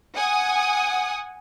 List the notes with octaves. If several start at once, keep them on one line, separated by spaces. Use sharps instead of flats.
F#5 G#5 D#6